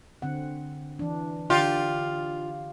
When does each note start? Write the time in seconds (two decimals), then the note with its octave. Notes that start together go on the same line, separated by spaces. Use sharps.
0.22 D3 C4 F#5
0.99 E3 D4
1.50 D3 F4 G4 D5